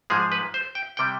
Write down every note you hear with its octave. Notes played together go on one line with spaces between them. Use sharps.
G#2 F3 G#3 G#4
B4
C5
G5
C3 G3 G5